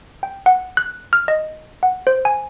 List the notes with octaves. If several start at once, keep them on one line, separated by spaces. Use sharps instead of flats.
G5
F#5
F#6
F6
D#5
F#5
C5
G#5